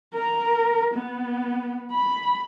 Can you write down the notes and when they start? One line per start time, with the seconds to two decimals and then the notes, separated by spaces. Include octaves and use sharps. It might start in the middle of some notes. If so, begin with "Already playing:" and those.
0.14 A#4
0.94 B3
1.92 B5